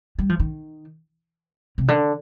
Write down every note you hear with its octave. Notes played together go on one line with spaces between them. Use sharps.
G3
F3
D#3
C3
D3